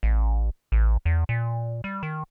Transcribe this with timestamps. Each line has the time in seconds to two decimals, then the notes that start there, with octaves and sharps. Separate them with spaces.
0.03 A1
0.72 A1
1.05 E2
1.29 A#2
1.84 G3
2.03 D#3